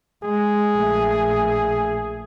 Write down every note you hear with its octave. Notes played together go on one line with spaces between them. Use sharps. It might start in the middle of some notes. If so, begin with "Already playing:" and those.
G#3 G#4
A#1 A3